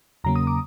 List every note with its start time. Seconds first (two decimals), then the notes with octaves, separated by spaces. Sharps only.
0.24 E2 C#3 F#3 A#3 A#5
0.36 D#6
0.47 D6